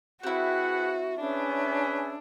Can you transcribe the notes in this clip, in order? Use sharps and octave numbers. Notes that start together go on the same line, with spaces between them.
C4 E4 F#4 G#4 B4 F#5
C#4 D4 G#4 B4 E5